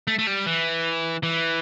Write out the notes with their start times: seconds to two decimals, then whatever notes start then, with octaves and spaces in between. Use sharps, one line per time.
0.07 A3
0.19 A3
0.27 G3
0.47 E3
1.23 E3